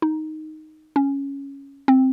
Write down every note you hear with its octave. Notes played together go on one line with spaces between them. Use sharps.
D#4
C#4
C4